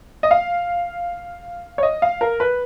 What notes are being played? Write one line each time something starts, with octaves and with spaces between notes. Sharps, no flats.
D#5
F5
C#5
D#5
F5
A#4
B4